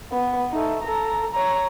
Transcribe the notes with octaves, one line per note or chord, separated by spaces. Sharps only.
B3
A3 D#4
A4 A#5
C#5 A#5